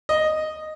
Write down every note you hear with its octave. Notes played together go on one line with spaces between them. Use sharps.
D#5